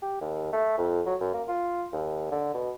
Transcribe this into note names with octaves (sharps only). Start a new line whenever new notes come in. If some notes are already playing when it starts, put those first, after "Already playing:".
G4
D#2
A3
F2
F#3
F#2
A#3
F4
D#2
D3
B2